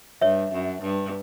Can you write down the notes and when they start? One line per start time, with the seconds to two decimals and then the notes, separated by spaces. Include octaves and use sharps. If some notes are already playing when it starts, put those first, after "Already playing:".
0.22 G2 C#5 E5
0.52 F#2
0.82 G2